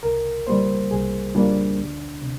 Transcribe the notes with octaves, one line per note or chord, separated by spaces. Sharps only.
C2 A#4
A#2 G3 A#3 C5
C2 G#4
A#2 G3 A#3 D4
D2
C3